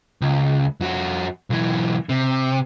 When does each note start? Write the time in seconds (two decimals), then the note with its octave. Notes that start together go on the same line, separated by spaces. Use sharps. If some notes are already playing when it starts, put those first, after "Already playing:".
0.21 C#2
0.80 F2 F#4
1.50 B1 E3
2.09 C3